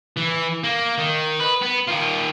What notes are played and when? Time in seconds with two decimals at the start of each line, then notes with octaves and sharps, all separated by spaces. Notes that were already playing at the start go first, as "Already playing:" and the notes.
0.17 E3
0.64 A#3
0.98 D#3
1.40 B4
1.62 B3
1.87 D#3 F4